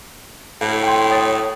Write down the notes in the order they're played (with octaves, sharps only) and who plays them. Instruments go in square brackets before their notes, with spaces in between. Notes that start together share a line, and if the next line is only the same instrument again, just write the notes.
[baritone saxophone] A2 [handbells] F5
[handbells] G5 C6
C#5 D#6 A6